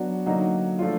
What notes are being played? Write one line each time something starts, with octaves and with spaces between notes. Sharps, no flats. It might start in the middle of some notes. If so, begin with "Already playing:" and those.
Already playing: F#3 B3 D4 F#4
D3 F#3 A#3 D#4 F#4
F3 A3 D4 F4